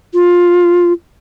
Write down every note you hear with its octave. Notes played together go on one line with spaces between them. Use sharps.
F4